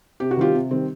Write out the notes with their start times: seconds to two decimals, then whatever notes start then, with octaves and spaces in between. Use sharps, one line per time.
0.20 C3 G4
0.31 F#4
0.37 D#3 G3 C4 F4 G4
0.54 C3
0.71 D#3 G3 C4